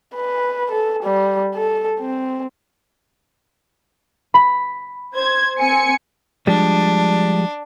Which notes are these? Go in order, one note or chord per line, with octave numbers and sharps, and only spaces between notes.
B4
A4
G3
A4
C4
B5
C5 G#6
C4 G#5 C#7
F3 G3 G#3 D4